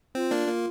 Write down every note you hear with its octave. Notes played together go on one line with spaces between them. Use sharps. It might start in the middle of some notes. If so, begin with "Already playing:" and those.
C4 F4
A#3 D4
A#3